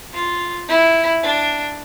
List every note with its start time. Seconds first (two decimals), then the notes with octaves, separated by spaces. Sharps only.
0.14 F4
0.69 E4
1.23 D4